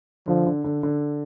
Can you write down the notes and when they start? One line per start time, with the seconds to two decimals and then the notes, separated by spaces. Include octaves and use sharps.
0.27 D3 F3
0.46 D3
0.64 D3
0.83 D3